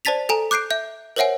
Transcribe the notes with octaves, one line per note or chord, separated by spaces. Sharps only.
C5 D5 A5 A6 B6 F7
A4 G#5 A#5
D6 F#6 G6 C7 D7
E5 G6
A#4 C5 C#5 E5 F#5 G#5